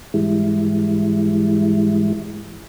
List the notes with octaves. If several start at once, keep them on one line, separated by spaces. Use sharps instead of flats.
G#2 E3 G3 G#3 E4